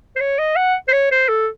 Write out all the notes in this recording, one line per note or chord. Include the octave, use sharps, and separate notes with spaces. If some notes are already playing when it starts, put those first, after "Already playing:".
C5
C#5
D#5
F#5
C5
C#5
C5
A4